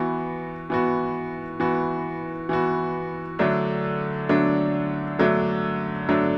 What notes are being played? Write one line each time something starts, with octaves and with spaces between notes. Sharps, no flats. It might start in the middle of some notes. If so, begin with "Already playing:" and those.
Already playing: E3 B3 F#4
E3 B3 F#4
E3 B3 F#4
E3 B3 F#4
D3 F#3 A3 D4
D3 F#3 A3 D4
D3 F#3 A3 D4
D3 F#3 A3 D4